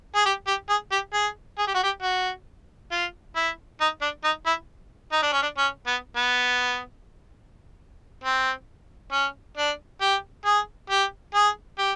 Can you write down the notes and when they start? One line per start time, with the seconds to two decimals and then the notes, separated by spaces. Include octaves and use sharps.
0.15 G#4
0.25 G4
0.47 G4
0.69 G#4
0.91 G4
1.13 G#4
1.58 G#4
1.67 G4
1.74 F#4
1.83 G4
2.02 F#4
2.91 F4
3.36 E4
3.81 D#4
4.02 D4
4.24 D#4
4.46 E4
5.12 D#4
5.23 D4
5.33 C#4
5.42 D4
5.58 C#4
5.87 B3
6.16 B3
8.24 C4
9.12 C#4
9.57 D4
10.01 G4
10.46 G#4
10.90 G4
11.35 G#4
11.78 G4